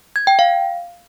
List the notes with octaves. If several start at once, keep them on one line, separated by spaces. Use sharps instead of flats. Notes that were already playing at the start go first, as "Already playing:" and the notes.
G#6
G5
F5